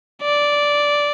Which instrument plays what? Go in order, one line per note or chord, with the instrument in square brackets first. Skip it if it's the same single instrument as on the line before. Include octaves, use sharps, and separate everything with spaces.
[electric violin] D5